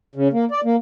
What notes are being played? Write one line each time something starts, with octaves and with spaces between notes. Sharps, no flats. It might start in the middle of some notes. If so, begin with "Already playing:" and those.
C#3
A#3
D5
A#3